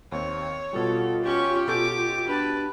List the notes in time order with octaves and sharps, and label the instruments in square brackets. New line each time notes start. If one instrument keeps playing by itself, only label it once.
[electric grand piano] D#2 C4 [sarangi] C#5
[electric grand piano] B2 G3 [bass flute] F4 [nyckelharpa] A4
[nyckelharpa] C#4 C#6 [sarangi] G4
[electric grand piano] B2 A4 G6 [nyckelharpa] D6
[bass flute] D4 [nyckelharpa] B4 A5